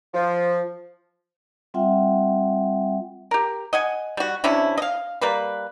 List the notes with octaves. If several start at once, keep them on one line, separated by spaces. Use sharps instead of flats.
F3
G3 C4 F4 E5 F#5 G5
G4 A#4
D#5 F#5 G#5
G3 F#4
C3 C#4 D4 E4
D#5 F5
G3 A#3 B4